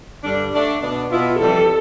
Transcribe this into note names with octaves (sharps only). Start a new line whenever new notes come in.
G2 D3 G3 D4
D3 A3 D4
B2 B3 D4
B2 B3 E4 F4
F2 C3 E3 G3 A4